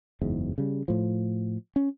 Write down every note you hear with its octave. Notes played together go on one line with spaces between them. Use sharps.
F#1 E2 G#2
C#3 G3
A2 F3
C#4